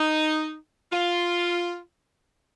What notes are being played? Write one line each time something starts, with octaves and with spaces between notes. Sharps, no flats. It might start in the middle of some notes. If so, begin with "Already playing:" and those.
Already playing: D#4
F4